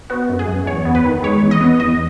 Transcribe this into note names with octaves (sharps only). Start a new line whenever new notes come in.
B3 F#4
F#2
G#4
F#2
E2 C#5
B3
B4
D#3
G#3 C#5
E2
D#5
B3
E2 D#5